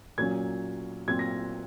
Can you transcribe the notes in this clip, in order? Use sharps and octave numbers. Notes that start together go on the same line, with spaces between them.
A#2 F#3 C#4 G#6
A#2 F#3 C4 G#6
A#6